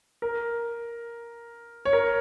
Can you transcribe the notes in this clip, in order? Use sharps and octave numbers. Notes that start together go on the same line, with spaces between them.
A#4
C#5
A#4